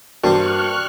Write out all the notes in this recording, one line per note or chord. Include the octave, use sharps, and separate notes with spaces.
G2 A#3 C4 F#4 C#6 F6 F#6